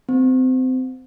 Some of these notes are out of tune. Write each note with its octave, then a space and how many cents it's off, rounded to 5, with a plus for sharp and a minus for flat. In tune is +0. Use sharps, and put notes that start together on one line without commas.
C4 -25